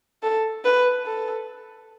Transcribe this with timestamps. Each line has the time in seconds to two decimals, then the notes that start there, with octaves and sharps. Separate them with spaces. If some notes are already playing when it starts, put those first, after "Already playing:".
0.23 A4
0.64 B4
1.06 A4